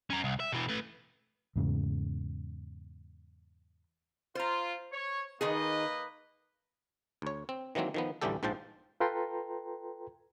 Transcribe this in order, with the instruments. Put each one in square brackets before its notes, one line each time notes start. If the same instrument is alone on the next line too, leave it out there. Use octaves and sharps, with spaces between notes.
[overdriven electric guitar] C#4 A#4
C2
E5
B2 E3
A3 B4
[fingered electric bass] E2 G#2 C#3
[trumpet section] F4 [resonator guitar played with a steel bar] C5 A#5
[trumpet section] C#5
[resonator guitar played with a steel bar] D#3 D#4 G#4 [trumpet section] A#3 B4 D#5
[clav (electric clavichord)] D2 C#5
C4
D#3 E3 F#3 A#3 C4
D#3 F3 B3
A1 D2 E3 G3 G4 A4
A#1 G#2 F3 C5 G5 A5
[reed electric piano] F4 A4 B4 G5 A#5 C6